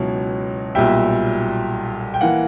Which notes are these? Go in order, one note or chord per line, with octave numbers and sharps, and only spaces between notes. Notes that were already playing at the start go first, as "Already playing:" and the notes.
Already playing: C#2 B2 F#3 C#4 E4
B1 A#2 G3 E5 G5
G5
E3 A#3 F#5